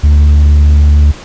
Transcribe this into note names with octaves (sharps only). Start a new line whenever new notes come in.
D2